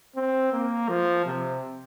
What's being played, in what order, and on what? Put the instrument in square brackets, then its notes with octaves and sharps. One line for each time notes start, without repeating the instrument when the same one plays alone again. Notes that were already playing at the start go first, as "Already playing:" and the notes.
[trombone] C4
A#3
F3
C3